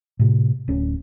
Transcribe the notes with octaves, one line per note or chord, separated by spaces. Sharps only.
A2 C3
D1 C#4